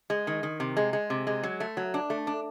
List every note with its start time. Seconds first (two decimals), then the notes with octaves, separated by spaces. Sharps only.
0.10 G#3
0.27 D#3
0.43 D#3
0.60 C3
0.77 G#3
0.93 G#3
1.10 C3
1.27 G#3
1.43 F#3
1.60 A3
1.77 F#3
1.94 D4
2.10 A3
2.27 D4